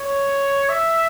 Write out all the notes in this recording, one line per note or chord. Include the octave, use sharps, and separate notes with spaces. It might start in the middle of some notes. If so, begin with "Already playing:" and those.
Already playing: C#5
E5